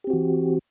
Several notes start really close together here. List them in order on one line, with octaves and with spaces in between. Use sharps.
G4 C4 F#4 E3